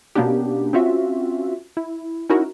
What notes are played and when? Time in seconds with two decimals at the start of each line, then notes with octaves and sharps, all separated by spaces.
0.15 B2 A#3 B3 C#4 D4 G4
0.73 C4 C#4 F4 F#4 E5
1.77 E4
2.29 C#4 D#4 E4 F#4 A#4